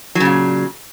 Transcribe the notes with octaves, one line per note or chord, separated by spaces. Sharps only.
A#2 C#3 F#3